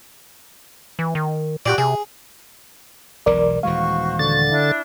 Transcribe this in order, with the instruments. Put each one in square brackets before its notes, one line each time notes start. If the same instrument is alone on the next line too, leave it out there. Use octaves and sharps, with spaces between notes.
[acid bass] E3
D#3
[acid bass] A#2 [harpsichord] F#4 G4 D5
[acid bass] C3 [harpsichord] G#4
[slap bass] E1 B1 E3 [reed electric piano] A#4 D5
[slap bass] D#1 E3 G#3 [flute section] F#4 C5 C#6 [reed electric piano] F5
[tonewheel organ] D3 A6
[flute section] D4 E4